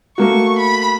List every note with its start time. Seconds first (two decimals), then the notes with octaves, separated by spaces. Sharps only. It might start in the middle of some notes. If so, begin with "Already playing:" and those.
0.18 A3 A#3 F#4 C#6
0.59 B5